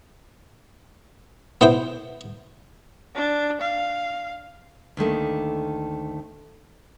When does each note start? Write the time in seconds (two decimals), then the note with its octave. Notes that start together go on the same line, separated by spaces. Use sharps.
1.61 B3 E4 C5 G5
3.16 D4
3.61 F5
4.97 D2 D#3 A3 A#3